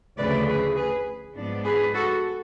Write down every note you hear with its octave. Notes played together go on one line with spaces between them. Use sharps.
D2 C#3 F3 A3 B4 D5
G#4 B4
G#4 B4
G#2 F3 B3 D4
G#4 B4
F#4 A4